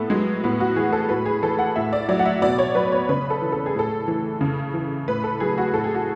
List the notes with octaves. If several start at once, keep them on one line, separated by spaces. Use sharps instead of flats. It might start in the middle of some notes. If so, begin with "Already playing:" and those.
Already playing: A2 A3 B3
F#3 G#3
A2 B3
F#4
E3 G#4
A4
A2 B4
G#4
E3 A4
F#5
A2 E5
D5
F#3 D5
F#5
E5
B2 D5
C#5
F#3 B4
C#5
C#3 B4
A4
E3
A4
G#4
A2 A4
E3
C#3
E3
A2 B4
A4
F#3 G#4
F#4
A2 A4
G#4
F#4